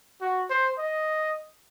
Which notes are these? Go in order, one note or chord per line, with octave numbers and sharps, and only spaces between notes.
F#4
C5
D#5